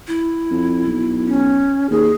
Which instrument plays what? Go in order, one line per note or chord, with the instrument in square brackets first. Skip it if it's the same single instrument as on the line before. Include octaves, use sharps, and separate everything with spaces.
[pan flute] E4
[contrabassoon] F2
B1
[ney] C#4
[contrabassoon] D#2 [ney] G#4